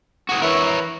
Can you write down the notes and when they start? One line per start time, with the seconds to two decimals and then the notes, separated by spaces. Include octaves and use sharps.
0.29 F#4 G#4
0.42 E3 A#4 C#5